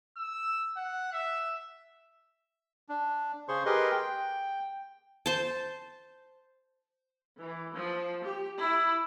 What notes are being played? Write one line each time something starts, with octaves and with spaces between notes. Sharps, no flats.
E6
F#5
E5
D4
C#3 G#4 C5 C6 C#6
G4 G#4 A#4 B4 D#5 C6
G5
C5 A5
E3
F3
G4
E4